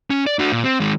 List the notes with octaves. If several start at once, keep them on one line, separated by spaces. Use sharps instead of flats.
C#4
D5
D4 F#4
A#2
C4
D#3 G#3